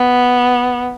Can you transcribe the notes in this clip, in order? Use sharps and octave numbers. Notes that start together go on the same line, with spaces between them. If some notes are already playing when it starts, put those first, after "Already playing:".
Already playing: B3